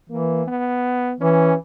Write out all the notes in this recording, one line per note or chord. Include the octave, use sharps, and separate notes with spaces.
E3 A#3
B3
E3 C#4